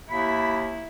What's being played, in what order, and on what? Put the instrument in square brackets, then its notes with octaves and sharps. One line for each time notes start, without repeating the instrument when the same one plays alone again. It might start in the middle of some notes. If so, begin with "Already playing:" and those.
[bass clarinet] D#2 [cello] E4 [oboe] B5